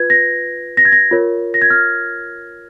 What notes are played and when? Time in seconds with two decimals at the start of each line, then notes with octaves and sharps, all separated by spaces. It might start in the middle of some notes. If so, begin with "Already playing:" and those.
Already playing: F4 B4 G#6
0.10 A#6
0.77 A#6
0.85 G#6
0.92 A#6
1.11 F4 A#4 C#5
1.54 A#6
1.62 G#6
1.70 F6